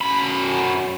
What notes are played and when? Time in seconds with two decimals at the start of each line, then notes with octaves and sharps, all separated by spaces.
0.01 F#2 B5